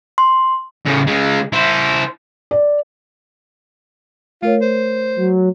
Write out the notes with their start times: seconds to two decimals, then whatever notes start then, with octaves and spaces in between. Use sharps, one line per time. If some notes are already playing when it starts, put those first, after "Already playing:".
0.18 C6
0.86 A2 C#3
1.07 C#3 G#3
1.53 E4 C5
2.51 D5
4.43 A3 F4 A#4 C#5
4.61 C5
5.16 F#3